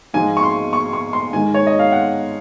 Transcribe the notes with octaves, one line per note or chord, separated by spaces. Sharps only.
G#2 F3 G#3 G#5
C#6
C6
C#6
C#6
C6
G#2 D#3 G#3 G#5
C#5
D#5
F5
F#5